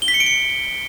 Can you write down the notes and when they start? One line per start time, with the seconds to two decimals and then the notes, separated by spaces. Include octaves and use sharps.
0.02 G7
0.08 B6
0.14 C#7
0.20 D7
0.26 C#7